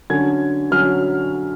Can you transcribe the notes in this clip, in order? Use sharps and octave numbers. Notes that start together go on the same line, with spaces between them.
D3 F#3 C#4 G#6
D3 F#3 C#4 F6